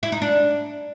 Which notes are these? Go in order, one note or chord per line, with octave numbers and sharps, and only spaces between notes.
E4
D#4
D4